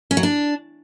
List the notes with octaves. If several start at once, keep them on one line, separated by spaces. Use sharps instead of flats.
C#4
F#3
D4